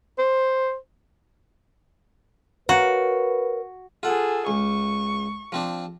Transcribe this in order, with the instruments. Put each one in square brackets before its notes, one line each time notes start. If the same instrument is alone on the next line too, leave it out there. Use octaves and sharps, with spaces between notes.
[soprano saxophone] C5
[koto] F#4 [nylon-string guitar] A#4 C#5 F5 [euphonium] B4
[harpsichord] F4 F#5 [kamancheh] G#4 A4
[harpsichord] C#2 [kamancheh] C#6
[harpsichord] F3 C4 D4